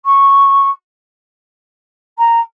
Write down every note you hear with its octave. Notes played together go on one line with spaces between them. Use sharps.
C#6
A#5